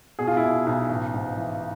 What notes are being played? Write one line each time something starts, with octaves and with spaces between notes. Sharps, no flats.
B2 G#4
F4
E4
B2 F4
B1
A1
G#2
E3